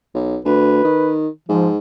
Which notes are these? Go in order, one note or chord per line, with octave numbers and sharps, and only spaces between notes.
B1
D2 B4
D#3
G#2 F3